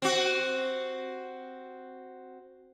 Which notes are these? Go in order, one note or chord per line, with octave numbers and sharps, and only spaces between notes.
C4 F#4